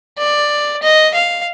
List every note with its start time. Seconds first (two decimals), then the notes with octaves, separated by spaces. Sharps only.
0.18 D5
0.82 D#5
1.14 F5